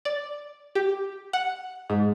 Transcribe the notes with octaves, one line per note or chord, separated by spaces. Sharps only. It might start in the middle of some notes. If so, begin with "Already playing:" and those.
D5
G4
F#5
G#2